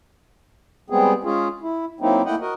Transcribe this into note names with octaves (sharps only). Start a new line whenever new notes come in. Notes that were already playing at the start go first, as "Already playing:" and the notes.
G3 G#3 B3 C4 G#4
G#3 C#4 F4 G#4
E4
F#3 A#3 C4 D#4 E4
A3 A#3 E4 D#5 F#5 G5
F#4 A#4 D#5